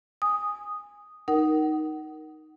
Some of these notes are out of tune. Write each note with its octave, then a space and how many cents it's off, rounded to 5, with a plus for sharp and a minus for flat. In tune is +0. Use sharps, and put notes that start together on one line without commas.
G#5 -15 D#6 +0
D#4 +0 A#4 +10 F#5 +35